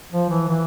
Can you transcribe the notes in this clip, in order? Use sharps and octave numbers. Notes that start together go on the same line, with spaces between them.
F3
E3
E3